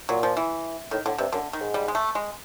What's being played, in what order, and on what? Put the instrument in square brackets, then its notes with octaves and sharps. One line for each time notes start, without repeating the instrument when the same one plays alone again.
[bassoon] A#2 [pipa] F#3
[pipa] F3
E3
[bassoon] A2 [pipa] D#3
[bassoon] A2 [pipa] D3
[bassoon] G2 [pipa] C3
[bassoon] F#2 [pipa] D3
[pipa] D#3
[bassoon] G#2
[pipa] G3
G#3
A3
G#3